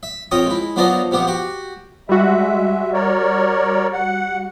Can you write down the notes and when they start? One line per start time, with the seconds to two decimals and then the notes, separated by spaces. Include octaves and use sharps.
0.03 E5
0.31 F2 A#4 C#5 G5 D#6
0.46 G#3 E4
0.76 F#3 B3 D4 F4 C5 D#5
1.11 C3 F3 B3 G4
1.27 F#4 G4
2.09 G3 G#3 F#4 E5
2.93 A#4 C#5 D5
3.92 F#5